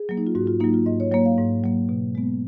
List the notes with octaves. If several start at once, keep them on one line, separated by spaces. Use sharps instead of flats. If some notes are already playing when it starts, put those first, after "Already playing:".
Already playing: G#4
F#3 A#3
D#4
F4
G#2 F#4
F4
F#3 A#3 D#4
F4
G#2 D#5
C#5
F#3 A#3 C#5
F5
G#2
F#3 A#3
B2
G#3 B3